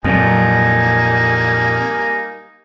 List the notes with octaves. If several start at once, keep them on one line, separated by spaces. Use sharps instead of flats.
F2 A#2 F#3 G3 A#3 C4 D#4 G#5